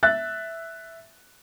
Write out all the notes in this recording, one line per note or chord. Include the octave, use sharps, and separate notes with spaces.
E5 F#6 A6